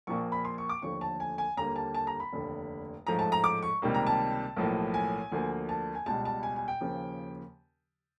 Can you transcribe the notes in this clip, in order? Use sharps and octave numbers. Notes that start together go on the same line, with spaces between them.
A#1 A#2 F3 A#3 C#6
B5
C6
C#6
D6
D#2 D3 F3 A3 C#6
A5
G#5
G#5
D#2 D3 G3 A#3 A#5
A5
A5
A#5
B5
F1 D#2 D3
A1 G#2 F3 A3 A#5
A5
A#5
D6
C#6
C#2 C3 D#3 G3 A#3
A#5
A5
B1 A2 F3 A#3
G#5
D2 D3 F3 A#3
A5
G#5
C#2 B2 G3 A5
A5
G#5
G#5
G5
D#2 C#3 F3 A#3